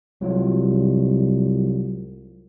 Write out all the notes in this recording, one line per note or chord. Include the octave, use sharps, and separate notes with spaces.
C2 F#3 G#3 F4